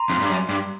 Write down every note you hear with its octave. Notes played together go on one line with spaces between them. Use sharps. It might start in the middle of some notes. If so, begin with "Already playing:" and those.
Already playing: A#5 C6
F2
G2
F#2
G2